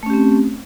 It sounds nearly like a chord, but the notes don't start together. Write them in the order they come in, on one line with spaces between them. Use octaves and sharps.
A3 C#4 G4 C4